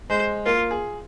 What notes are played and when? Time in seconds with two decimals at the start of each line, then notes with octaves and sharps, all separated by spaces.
0.10 G#3 C5
0.46 A#3 F4
0.71 G#4